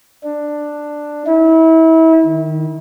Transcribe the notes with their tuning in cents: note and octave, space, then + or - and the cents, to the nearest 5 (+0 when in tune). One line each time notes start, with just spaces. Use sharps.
D4 +10
E4 -30
D#3 -5